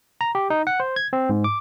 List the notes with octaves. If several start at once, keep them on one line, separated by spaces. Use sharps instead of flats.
A#5
G4
D#4
F#5
C5
G#6
C4
G#2
D6